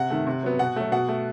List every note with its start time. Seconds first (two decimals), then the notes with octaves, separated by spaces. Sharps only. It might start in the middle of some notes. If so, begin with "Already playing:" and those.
Already playing: C3 F#5
0.10 D#3 A3
0.27 C3
0.43 F#3 B3
0.59 B2 F#5
0.76 F#3 A3
0.92 B2 F#5
1.09 A3